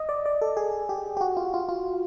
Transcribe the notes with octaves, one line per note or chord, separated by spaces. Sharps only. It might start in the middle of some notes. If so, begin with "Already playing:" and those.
Already playing: D#5
D5
D5
A4
G#4
G4
G4
F#4
F4
F4
F4